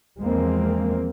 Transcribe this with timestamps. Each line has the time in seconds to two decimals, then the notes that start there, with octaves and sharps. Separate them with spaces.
0.19 E2 F3 G#3 A#3 C4